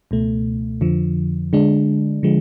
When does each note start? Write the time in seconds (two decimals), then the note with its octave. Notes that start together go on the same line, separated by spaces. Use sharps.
0.11 C#2 B2 A3
0.81 F2 D3 F3
1.53 D3 G#3 D4
2.23 D3 F3 G#3